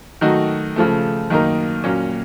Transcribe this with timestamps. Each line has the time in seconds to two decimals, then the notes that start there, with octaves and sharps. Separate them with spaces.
0.21 D#3 F#3 A3 D#4 F#4
0.76 C#3 F3 A3
1.30 F#2 D#3 A#3 D#4 A#4
1.84 A#2 F#3 A#3 C#4